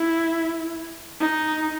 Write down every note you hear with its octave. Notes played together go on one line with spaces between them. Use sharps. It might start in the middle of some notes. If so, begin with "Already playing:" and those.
Already playing: E4
D#4